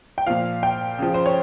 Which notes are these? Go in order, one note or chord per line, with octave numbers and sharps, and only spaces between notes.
G5
A#2 F3 F5
G5
C#3 F3
C5
C#5